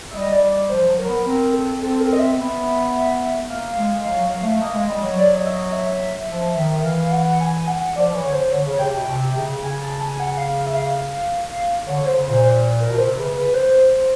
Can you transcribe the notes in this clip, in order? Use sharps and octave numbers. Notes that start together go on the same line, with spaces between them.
E5
G3 D#5
D5
D5
F3 C5
F#3
A#4
B3
C4 A#4
A4
C4 A4
A#4
D#5
E5
B3
A#3 F5
G#3
F#3
F#3
A3
A#3 D#5
G#3
G3
F#3
D5
D#5
E5
D#5
E5
F3
D#3
E3 F5
F#5
G#5
F#5
F3 D5
E3 C#5
D3
C5
D3 C#5
C#3
C3 G5
B2
C3
C#3
C#3 G#5
A5
G#5
F#5
F5
F5
E5
F5
D3 C#5
D3 C5
C#3
A#2 C5
C5
A#4
B2
C3 C5
C#3 B4
B4
C5